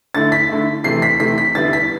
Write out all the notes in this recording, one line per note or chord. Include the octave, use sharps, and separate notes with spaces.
D3 A3 E4 A6
B6
D3 A3 E4
C3 E3 A3 C7
B6
C3 E3 A3 B6
B6
D3 G3 B3 E4 A6
B6